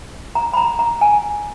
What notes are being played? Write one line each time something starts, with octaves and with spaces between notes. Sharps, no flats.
A#5
B5
A#5
A#5
G#5